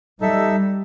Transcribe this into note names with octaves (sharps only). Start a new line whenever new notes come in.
G3 D#4 A4 E5